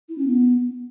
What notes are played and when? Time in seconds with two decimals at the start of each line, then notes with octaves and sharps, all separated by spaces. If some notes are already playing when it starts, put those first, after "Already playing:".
0.08 E4
0.17 C#4
0.26 B3